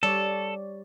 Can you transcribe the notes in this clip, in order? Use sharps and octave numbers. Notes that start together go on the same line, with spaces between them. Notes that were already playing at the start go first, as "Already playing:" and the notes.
G3 A4 C#5 D5